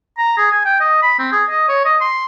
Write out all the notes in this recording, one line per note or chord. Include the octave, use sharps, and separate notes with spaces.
A#5
G#4
G#5
G5
D#5
B5
C4
G#4
D#5
C#5
D#5
C6